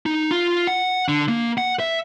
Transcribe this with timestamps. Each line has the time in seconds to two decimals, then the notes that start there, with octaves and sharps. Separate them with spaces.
0.06 D#4
0.31 F4
0.67 F#5
1.09 D3
1.28 A#3
1.58 F#5
1.80 E5